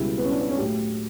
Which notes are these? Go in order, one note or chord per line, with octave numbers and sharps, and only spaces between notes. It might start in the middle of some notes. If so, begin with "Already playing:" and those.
Already playing: C#2 B2 G3 E4
B3
C#4
D4
B3
C#4
A2 F#3 A3 G4